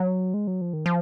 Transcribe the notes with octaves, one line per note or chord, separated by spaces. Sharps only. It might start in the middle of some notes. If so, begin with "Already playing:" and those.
Already playing: F#3
G#3
F#3
F3
D#3
F3